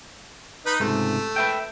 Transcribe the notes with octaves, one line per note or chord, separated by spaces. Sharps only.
D#4 B4
C#2 G#2 C3 A3
B4 E5 G5